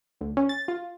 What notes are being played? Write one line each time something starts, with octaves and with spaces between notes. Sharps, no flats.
D2
C#4
A6
F4